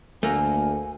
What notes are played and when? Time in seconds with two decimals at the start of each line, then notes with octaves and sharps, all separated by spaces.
0.23 D2 A3 A#3 G#5